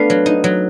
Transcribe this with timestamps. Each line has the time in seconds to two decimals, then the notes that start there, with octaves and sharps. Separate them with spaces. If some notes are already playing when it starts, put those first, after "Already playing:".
Already playing: A3 B3 D4 F5
0.10 F#3
0.26 D#4
0.44 F#3